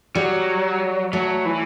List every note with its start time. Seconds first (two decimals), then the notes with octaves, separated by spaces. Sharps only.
0.15 F#3 G3
1.13 F#3 A3
1.45 E3